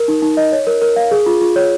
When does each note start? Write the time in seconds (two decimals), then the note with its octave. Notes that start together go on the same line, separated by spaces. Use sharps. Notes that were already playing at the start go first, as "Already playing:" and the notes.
Already playing: A#4
0.08 D#4
0.22 D#4
0.37 D#5
0.52 C#5
0.67 A#4
0.82 A#4
0.96 F5
1.11 G#4
1.26 F4
1.41 F4
1.56 C#5